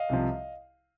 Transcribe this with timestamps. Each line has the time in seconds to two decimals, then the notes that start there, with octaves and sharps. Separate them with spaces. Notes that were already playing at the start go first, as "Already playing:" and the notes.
Already playing: D#5 F5
0.09 C2 C3 F3